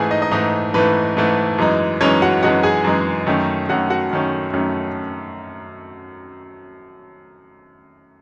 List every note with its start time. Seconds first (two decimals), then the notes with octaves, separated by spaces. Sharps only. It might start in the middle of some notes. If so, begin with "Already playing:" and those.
Already playing: G#2 E3 A3 G#4 G#5
0.11 D#4 D#5
0.21 D#4 D#5
0.31 G#2 E3 A3 D#4 D#5
0.74 G#2 E3 A3 B4
1.17 G#2 E3 A3
1.58 F#2 E3 G#3 D#4
2.01 F#2 E3 G#3 C#4 D#4 C#5
2.22 F#4 F#5
2.43 F#2 E3 G#3 D#4 F#4 F#5
2.63 G#4 G#5
2.84 F#2 E3 G#3 D#4
3.27 F#2 D#3 A3 C#4
3.69 F#2 D#3 A3 C#4 F#4 F#5
3.90 F#4 F#5
4.11 F#2 D#3 A3 C#4
4.54 F#2 D#3 A3 C#4